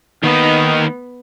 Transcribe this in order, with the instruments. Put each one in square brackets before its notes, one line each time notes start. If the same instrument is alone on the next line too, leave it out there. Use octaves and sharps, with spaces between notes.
[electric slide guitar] D#3 D#5 [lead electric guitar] A#3 D#4 [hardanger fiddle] B3